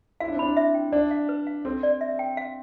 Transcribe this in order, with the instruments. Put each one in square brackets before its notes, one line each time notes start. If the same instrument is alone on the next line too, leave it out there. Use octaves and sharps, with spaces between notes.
[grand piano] E4 [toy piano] F5
[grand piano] D4
C4
[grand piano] D4 [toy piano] B5
[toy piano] E5
G5
[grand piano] D4 [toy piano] D5
[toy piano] F5
B4
F5
[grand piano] C4 [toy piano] A4
[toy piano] D5
E5
G5
F5